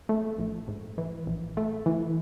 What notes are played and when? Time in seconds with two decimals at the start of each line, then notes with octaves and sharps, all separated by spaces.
0.09 A3
0.38 A#1
0.68 G#2
0.98 E3
1.27 A#1
1.57 A3
1.86 E3